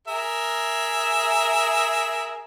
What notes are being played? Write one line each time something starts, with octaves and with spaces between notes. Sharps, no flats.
G#4 A#4 E5